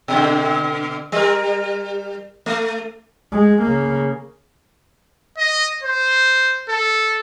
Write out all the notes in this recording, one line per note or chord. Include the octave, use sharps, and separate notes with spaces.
B2 D3
G3 A#4
A3
G#3
C#3 A#3
D#5
C5
A4